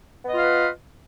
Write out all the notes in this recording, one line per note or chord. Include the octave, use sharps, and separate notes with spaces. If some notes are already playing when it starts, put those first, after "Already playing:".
B3 F4 B4 D#5 F5